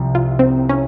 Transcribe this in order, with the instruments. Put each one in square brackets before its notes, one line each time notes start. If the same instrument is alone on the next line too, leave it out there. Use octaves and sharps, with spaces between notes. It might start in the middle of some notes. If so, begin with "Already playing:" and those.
Already playing: [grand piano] C2 C3 F3
[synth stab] F4
C4
C#4